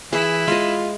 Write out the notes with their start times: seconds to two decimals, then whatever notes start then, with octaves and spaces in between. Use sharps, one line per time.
0.13 E3 E4 G#4
0.47 G#3 F4 D#5